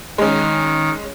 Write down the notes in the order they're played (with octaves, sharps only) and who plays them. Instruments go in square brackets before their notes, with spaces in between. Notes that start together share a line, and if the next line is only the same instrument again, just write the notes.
[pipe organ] D#3 [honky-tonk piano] G#3 C#4